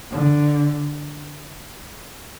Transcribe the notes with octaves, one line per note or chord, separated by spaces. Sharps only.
D3